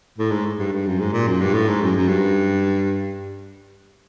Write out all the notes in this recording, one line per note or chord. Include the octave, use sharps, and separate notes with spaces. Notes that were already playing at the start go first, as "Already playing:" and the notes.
A2
G#2
G2
G2
F#2
G#2
A#2
F#2
G2
A2
G#2
F#2
F#2
G2